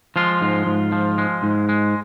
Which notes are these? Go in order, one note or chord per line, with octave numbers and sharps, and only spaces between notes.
F3 G#3 F4
G#2
G#2
F3
G#3
G#2
G#3